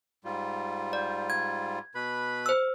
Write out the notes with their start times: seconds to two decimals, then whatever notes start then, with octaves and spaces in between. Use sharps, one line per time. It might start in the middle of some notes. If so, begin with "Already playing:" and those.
0.24 G#2 G3 F4
0.93 D5
1.30 G#6
1.95 B2 B4 B5
2.46 C5 E6